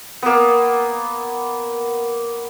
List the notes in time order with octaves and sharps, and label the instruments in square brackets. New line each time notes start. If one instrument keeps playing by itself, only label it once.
[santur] A#3 B3